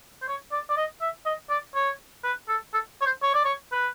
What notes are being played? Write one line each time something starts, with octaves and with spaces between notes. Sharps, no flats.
C5
C#5
D5
D5
D#5
E5
D#5
D5
C#5
B4
A4
A4
C#5
C5
C#5
D5
C#5
B4